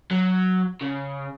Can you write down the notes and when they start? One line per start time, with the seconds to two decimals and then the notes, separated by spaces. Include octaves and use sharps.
0.11 F#3
0.81 C#3